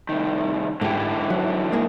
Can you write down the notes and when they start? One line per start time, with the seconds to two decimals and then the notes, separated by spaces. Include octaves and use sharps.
0.09 C2 D#3
0.81 G#2 D3 E3 G4
1.30 F#3
1.72 G#3 A#3 G#4